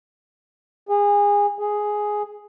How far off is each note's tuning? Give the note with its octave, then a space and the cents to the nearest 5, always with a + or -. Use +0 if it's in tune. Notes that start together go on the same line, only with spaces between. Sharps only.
G#4 -25
G#4 +5